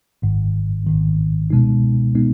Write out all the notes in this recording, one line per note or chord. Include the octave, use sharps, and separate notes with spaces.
G#1 G#2 D#3
G#1 G#2 D#3
C#2 B2 G#3 B3 D#4
B2 G#3 B3 D#4